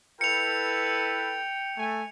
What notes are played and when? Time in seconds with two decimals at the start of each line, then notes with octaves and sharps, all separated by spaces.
0.21 E4 A4 B4 G5 C#7 F7
1.78 A3 G#5